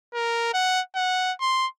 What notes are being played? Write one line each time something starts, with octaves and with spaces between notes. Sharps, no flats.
A#4
F#5
F#5
C6